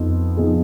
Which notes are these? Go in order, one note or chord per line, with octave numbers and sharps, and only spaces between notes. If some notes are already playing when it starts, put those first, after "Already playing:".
Already playing: F2 F3 B3 D#4
F3 B3 D#4 G#4